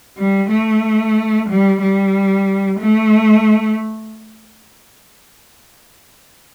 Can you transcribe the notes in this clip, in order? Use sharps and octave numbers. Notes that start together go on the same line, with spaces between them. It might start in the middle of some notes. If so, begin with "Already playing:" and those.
G3
A3
G3
G3
A3